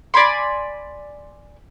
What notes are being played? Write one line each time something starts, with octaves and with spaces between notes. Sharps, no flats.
D5 G#5 B5 C6